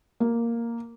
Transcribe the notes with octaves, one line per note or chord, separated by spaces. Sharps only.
A#3